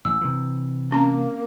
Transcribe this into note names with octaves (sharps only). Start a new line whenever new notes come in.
A1 E6
C3 E3
A#3 C4 C#4 A#5